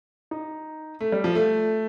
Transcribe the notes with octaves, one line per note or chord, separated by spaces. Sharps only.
D#4
A3
G3
F3
A3